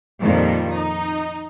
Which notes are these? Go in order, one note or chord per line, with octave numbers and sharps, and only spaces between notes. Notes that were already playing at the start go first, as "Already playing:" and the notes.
F2 A#2 D#3 F3 G3
D#4